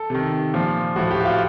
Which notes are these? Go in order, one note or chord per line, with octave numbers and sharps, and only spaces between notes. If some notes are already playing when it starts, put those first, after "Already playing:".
Already playing: A4
C3 D#3
A#2 F3
A2 F3 F#4
G4
F#4
F4